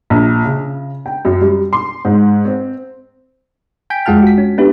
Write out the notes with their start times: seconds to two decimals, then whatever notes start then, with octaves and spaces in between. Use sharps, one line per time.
0.10 A#1
0.45 C#3
1.06 G5
1.25 F#2
1.41 G3
1.73 C6
2.05 G#2
2.45 C4
3.90 G5 G#5 G6 B6 D7
4.06 F2 G#3 F4 F#5 A5 F6
4.23 F#4 B6
4.38 C#4
4.58 B3 D4 E4 G4 B4